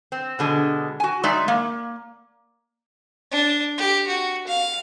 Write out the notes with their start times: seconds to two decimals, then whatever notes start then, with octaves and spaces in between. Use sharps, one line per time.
0.12 C4
0.39 B2 D3 G#3
1.00 F#4 G#5
1.23 G#3 D#4 D5 E5
1.48 A#3
3.32 D4
3.78 G4
4.07 F#4
4.48 F5